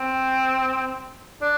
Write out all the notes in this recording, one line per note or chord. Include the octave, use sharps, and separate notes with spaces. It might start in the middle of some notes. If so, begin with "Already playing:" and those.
Already playing: C4
D4